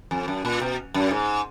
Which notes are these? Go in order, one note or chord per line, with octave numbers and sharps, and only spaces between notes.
F2
F#2
A#2
B2
F#2
G#2